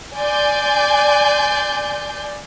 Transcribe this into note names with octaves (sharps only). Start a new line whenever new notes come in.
D5 G#5 C6 G6